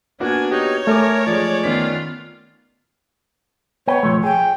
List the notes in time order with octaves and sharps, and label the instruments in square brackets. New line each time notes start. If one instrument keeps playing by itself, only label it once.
[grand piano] A#3 B3 F#4 [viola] D4 G#5
[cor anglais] D#4 [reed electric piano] G4 [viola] C#5
[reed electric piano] A3 [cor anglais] A#4 [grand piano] D5 G#5 D6
[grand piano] F3 G#3 [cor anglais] D5
[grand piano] D#3 C#4 B6 [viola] B3 F4
[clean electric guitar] B3 G5 [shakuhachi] C#5
[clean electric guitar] B1 F3 A3
[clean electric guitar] G#4 [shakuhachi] G5